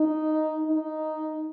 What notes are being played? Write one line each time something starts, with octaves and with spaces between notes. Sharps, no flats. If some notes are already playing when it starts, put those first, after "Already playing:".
Already playing: D#4
D#4